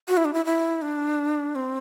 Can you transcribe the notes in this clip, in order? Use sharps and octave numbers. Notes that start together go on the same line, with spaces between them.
F#4
E4
D4
E4
E4
D4
C4